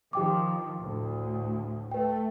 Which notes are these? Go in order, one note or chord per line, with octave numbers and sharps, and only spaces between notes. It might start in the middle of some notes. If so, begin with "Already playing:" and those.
D#3 F3 G4 G5 D6
D2 A2
A3 B4 G5